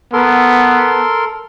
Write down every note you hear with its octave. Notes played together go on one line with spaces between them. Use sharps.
B3 A4 A#4 C6